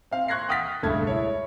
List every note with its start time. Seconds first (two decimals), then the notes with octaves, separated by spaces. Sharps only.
0.11 C4 F5
0.28 C6 C#6 F#6 G#6 A#6 C7
0.48 F#5 G5 D#6 F6 A6 B6
0.82 E1 C#2 G2 A3 A5 G#6
1.07 E4 C#5